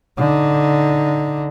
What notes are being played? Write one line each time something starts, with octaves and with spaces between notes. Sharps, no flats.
D3 D#4